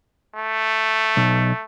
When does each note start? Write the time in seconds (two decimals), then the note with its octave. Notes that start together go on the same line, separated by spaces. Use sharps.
0.35 A3
1.17 B1